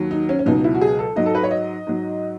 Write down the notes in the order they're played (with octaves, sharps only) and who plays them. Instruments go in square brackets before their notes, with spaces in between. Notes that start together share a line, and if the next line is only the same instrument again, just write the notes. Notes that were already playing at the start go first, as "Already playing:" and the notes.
Already playing: [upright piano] D#2 D#3 F#3
D#4
C#4
C#4
C#2 B2 F#3 D#4
E4
F#4
G#4
A4
G#2 F#3 D#5
A4
B4
C#5
D#5
G#2 F#3